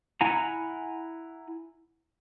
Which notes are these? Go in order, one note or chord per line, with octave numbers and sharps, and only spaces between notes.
E4 F#5 G#5 A#5